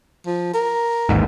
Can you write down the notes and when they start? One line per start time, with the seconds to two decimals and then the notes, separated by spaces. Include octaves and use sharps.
0.26 F3
0.54 A#4
1.09 A1 D#2 G#2